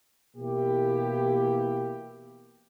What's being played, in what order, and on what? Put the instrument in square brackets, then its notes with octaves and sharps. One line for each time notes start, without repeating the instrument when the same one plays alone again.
[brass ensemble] B2 E3 A#3 E4 G4